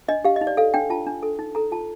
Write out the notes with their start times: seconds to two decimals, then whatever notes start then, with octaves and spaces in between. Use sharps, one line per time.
0.08 D4 D#5
0.25 G4 F5
0.36 D#5
0.41 D#4
0.47 D5
0.57 A4 F5
0.74 D4 G5
0.90 F4 A5
1.07 D4
1.23 A4
1.39 D#4
1.55 A4 A#5
1.71 F4 A5